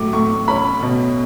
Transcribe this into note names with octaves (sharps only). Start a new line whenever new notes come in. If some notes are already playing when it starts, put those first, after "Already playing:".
Already playing: A2 F#3 D6
A2 C#6
C#4 B5
B2